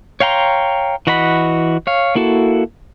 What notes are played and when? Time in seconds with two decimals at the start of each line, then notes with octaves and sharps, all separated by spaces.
0.20 C#5 F5 G5 A#5 C6
1.07 E3 F#4 D#5 F#5 B5
1.87 C#5 F5
2.15 A#3 E4 F#4 A4